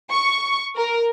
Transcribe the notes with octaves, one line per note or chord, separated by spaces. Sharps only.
C#6
A#4